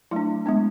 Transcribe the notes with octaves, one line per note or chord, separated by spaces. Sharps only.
F#3 A3 D4 E4
G#3 B3 D4